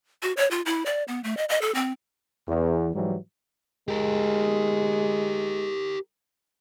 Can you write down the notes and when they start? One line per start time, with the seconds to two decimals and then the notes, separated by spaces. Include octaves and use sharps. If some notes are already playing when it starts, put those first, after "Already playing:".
0.23 F#4
0.37 C#5
0.51 F4
0.66 E4
0.86 D5
1.08 B3
1.24 A3
1.37 D#5
1.49 D#5
1.62 A4
1.75 C4
2.48 E2
2.95 G#2 E3 F#3 G3
3.89 G#3 G4 A#4